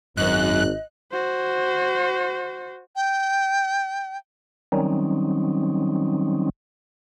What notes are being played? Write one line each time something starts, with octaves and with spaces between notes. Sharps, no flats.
G#1 F#2 D#5 F#6
F#4 C5
G5
D#3 F#3 G3 C4 C#4 D#4